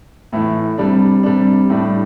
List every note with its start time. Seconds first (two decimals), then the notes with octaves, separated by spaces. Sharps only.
0.33 A2 E3 A3
0.78 C3 G3 D4
1.23 C3 G3 D4
1.70 A2 G3 D4